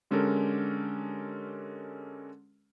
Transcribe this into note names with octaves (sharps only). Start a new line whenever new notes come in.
D3 G#3 C#4 G4 A4 A#4